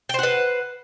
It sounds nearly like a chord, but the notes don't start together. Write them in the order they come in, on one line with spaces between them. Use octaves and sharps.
G5 C5 F#5 B4